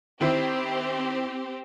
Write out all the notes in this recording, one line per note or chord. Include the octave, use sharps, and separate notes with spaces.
D#3 C4 E4 G4 C5